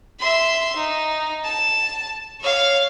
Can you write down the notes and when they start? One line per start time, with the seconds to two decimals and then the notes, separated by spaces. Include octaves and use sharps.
0.19 E5 C6
0.76 D#4
1.43 A5
2.41 C#5 F5